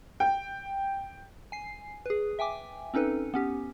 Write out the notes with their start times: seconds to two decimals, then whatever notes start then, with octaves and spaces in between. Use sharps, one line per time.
0.20 G5
1.52 G#5 C7
2.06 G#4 B4
2.39 E5 G5 G#5 D6
2.94 C4 C#4 D#4 A4 B4
3.34 B3 C#4 G4